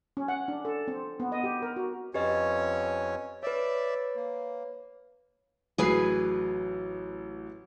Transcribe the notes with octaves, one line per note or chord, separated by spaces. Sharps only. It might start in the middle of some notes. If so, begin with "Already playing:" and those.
C#4
F#5
D4
A4
C4
B3
D#5
G4
A#4
F#4
F2 C#4 G4 B4 C#5 D#5
B4 C#5 D5 E5
A#3
A1 F#3 G#4 B4 G#5 C7